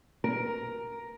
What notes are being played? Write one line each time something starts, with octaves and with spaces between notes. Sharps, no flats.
A#4